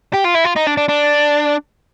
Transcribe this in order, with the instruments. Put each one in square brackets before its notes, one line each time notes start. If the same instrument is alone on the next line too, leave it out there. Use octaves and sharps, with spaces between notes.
[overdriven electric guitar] G4
F4
E4
F4
D#4
D4
D4
D4